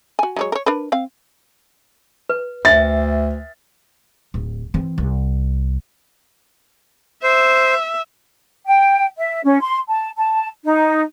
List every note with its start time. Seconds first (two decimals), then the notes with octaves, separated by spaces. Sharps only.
0.19 F#4 G#5
0.36 F#3 G#3 C#5
0.52 A#4 C#5
0.66 D4 A#4 B4
0.92 C4 F5
2.29 B4
2.65 D2 E5 G5 G#5 A6
4.34 D1
4.74 E3 C4
4.98 C2
7.24 C5 E5
8.67 G5
9.18 E5
9.45 C#4
9.61 C6
9.89 A5
10.18 A5
10.65 D#4